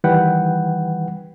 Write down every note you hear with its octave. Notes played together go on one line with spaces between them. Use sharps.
D#3 E3 G3 B4 F#5 G5